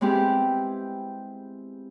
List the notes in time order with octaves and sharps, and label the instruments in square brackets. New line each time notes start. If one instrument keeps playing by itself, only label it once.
[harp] G#3 B3 C4 E4 G4 G#4